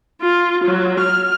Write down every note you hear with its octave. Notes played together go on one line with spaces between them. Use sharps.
F4
F#3
F6